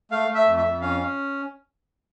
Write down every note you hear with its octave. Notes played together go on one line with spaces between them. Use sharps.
A3 F5
A3
E5
F2
E5
F2
C#4 F5
C#4